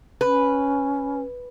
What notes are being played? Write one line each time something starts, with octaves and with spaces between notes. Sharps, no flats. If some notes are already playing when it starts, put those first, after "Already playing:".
C#4 B4